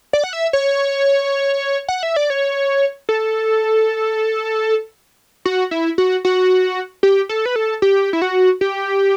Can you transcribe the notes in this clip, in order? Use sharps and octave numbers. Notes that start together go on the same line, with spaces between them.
D5
F#5
E5
C#5
F#5
E5
D5
C#5
A4
F#4
E4
F#4
F#4
G4
A4
B4
A4
G4
E4
F#4
G4